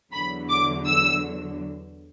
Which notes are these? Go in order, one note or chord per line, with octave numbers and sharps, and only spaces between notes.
E2 D3 F#3 B5
D6
E6